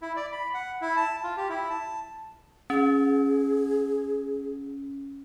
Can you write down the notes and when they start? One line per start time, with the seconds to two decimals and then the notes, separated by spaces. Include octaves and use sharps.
0.02 E4
0.16 D5
0.32 B5
0.54 F#5
0.81 E4
0.97 A5
1.24 F4
1.37 G4
1.49 E4
1.70 A5
2.70 C#4 G#4